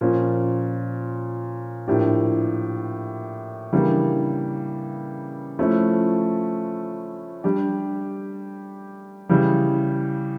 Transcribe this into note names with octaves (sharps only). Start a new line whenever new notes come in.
A#2 F3 C#4
A2 F3 A#3 D4 G4
C#3 E3 G3 A#3 D4
F3 A3 C#4 E4
G3 D4 G4
C#3 E3 G3